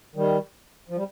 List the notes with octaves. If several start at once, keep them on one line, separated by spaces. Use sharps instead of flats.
D#3 G3
F3
G3